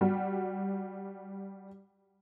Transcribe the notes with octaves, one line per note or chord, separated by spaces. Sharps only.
G3 F#4